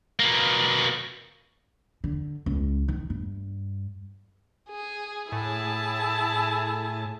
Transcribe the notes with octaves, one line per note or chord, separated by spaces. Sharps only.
B2 A#3
D3
C#2
D#3
G2
G#4
A2 E4 G#4 A5